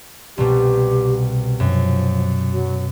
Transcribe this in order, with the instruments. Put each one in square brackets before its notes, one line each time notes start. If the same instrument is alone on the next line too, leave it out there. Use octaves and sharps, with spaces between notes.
[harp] C2 B2 [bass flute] G4
[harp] F#2 [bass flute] F3
[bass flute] F#3